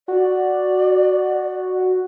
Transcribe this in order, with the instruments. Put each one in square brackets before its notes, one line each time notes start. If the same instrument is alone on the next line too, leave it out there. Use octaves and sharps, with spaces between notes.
[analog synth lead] F#4 [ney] D5